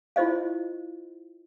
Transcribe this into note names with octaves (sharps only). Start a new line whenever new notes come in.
E4 F4 C5 D#5 F5